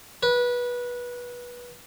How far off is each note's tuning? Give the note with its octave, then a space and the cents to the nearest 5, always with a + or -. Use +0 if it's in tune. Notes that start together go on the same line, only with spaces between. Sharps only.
B4 -20